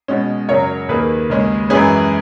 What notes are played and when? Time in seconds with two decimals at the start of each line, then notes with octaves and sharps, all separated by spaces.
0.08 B2 G#3 C#4
0.48 F#2 C#3 F#3 A#4 C#5
0.89 D#2 D#3 A#3 G#4 B4
1.29 D#2 C#3 G#3 C#4
1.70 F#2 E3 G#3 C#4 G#4 B4